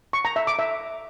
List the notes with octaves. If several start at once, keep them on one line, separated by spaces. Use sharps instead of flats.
C#6
A#5
E5
D6
E5